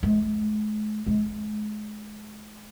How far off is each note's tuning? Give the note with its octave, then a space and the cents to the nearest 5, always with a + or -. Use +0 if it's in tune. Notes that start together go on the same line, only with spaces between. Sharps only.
G#3 +45
G#3 +35